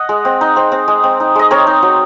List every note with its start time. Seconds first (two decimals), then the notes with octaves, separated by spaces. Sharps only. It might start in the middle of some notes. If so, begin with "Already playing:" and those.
Already playing: D#5 F#5
0.09 G#3
0.25 C4
0.41 D#4
0.56 C4
0.72 C4
0.88 G#3
1.03 C4
1.20 D#4
1.35 G#3 D#5
1.51 C4 A#4 C#5
1.67 D#4
1.82 F#3